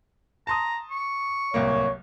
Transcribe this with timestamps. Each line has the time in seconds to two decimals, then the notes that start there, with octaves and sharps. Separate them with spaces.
0.47 A5 A#5 C6 D#6
0.91 C#6
1.54 D1 C2 A#3 C#5